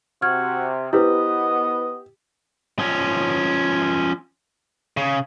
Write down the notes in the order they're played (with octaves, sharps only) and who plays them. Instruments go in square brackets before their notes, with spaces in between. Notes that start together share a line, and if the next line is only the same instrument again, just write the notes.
[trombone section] C3 [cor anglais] F#4 [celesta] F6 G#6
[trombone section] B3 [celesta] E4 B4 C5 [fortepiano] G4 [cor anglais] D#5
[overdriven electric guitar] F3 C#4
C#3